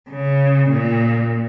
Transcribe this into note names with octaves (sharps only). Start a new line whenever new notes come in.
C#3
A#2